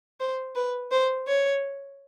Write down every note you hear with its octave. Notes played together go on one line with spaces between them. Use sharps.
C5
B4
C5
C#5